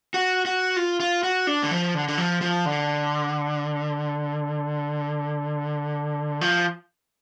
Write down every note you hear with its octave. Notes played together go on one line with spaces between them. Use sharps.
F#4
F#4
F4
F4
F#4
D4
D3
F3
D3
D3
F3
F3
D3
F3